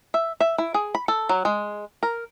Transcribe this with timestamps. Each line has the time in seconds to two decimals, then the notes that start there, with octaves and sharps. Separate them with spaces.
0.14 E5
0.40 E5
0.58 E4
0.74 G#4
0.95 B5
1.08 A4
1.29 F#3
1.45 G#3
2.03 A#4